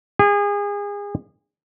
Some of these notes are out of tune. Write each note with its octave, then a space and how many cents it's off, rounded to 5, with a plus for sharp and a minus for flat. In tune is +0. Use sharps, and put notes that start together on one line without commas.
G#4 -30